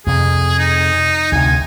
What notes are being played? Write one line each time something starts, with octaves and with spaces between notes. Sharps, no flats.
F2 C3 G#4
D#4
D2 C3 G#5